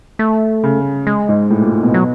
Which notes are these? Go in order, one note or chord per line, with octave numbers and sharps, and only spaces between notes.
A3
C#3
G#3
G#2
A2
A#2
A#2
B2
F#3